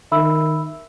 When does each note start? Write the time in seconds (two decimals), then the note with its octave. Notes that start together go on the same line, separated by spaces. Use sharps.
0.12 D#3 E5 B5 E6